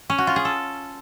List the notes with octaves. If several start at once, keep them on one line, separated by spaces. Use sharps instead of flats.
C#4
F#4
F4
G#4
A4